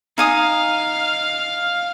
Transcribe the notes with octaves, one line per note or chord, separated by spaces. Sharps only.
D#4 F5 G#5 D#6